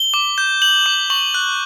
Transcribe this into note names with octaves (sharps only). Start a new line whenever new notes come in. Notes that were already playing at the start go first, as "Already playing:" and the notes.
Already playing: G7
D6
G6
G6 F#7
D6
C#6 F#7
F#6